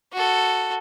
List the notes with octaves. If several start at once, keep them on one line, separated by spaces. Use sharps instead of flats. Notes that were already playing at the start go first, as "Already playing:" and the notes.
F#4 A4